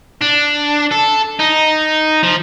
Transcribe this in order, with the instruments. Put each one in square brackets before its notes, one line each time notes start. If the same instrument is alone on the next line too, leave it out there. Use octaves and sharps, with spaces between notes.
[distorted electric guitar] D4
A4
D#4
F3